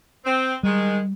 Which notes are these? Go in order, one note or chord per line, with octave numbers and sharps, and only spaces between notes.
C4
D#3 G3 G#3